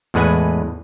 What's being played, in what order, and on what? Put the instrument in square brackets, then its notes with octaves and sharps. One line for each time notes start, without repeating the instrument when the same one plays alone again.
[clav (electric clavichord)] E2 A2 G#3 B4 F#5 G#5